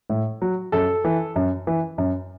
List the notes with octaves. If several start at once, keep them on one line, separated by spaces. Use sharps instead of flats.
A2
F#3
F#2 A4
E3
F#2
E3
F#2